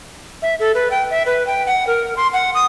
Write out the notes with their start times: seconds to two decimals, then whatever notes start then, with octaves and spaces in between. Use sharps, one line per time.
0.42 E5
0.60 A4
0.75 B4
0.91 G5
1.10 E5
1.26 B4
1.47 G5
1.67 F#5
1.87 A#4
2.17 C6
2.33 F#5
2.55 D#6